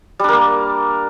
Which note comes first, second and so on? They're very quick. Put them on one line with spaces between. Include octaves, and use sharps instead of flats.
G3 D4 A#4 A#3